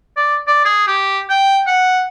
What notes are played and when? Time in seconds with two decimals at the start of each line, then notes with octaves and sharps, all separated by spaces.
0.17 D5
0.47 D5
0.65 G#4
0.87 G4
1.29 G5
1.67 F#5